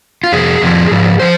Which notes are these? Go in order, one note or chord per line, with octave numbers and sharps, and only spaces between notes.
F4
F2 C3 G#4
F2 C3 F3
G#2 F3
F3 C5